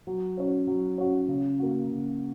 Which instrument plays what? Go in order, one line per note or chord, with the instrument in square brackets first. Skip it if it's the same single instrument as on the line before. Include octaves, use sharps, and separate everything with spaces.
[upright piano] F#3
C#4 F#4 C#5
F#3
C#4 F#4 C#5
C#3
A#3 F#4
C#3